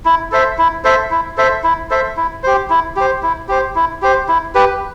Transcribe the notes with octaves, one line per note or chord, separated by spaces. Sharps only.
E4
A4 C5 E5
E4
A4 C5 E5
E4
A4 C5 E5
E4
A4 C5 E5
E4
G4 C5
E4
G4 C5
E4
G4 C5
E4
G4 C5
E4
G4 B4